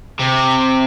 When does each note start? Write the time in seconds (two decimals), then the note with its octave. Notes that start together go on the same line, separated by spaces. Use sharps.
0.20 C3